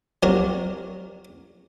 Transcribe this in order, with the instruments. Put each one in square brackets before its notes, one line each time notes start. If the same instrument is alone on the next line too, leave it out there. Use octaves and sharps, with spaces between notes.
[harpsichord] F#3 C4 F#4 G4 A#4